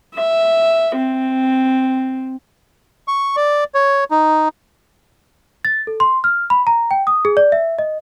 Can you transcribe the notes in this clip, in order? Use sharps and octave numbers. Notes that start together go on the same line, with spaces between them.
E5
C4
C#6
D5
C#5
D#4
A6
A4
C6
F6
B5
A#5
G5
D#6
G#4
D5
E5
D#5